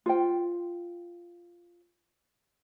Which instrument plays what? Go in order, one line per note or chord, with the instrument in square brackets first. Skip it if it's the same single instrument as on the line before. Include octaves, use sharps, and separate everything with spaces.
[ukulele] F4 C5 G5